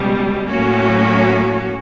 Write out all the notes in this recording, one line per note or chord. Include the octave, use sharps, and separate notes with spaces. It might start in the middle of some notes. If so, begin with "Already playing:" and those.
Already playing: C#2 B2 G3
A2 F#3 A#3 C#4 F#4